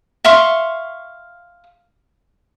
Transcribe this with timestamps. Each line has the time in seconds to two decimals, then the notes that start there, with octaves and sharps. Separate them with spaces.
0.25 E5 F5 C6 C#6